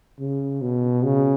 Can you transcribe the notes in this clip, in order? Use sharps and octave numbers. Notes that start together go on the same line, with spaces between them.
C#3
B2
C#3